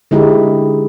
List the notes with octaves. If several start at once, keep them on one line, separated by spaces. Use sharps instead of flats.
D3 G#3 D#4 E4 G4